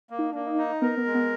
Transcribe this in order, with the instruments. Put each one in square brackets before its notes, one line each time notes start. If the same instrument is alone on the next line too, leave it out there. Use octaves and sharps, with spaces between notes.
[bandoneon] A#3
[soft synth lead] D#4
[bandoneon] A#3 [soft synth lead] D4
[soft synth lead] D#4
[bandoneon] D#4
[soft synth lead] B3 [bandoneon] A#4
[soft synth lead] B3
[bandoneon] G#3
[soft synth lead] B3